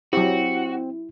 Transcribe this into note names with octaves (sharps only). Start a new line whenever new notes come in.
F#3 C4 E4 F#4 G4